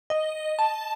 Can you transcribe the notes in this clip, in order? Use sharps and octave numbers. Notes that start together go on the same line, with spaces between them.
D#5
A5